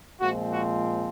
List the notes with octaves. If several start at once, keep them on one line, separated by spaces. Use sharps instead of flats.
A#2 F3 G#3 C4 F#4
F#4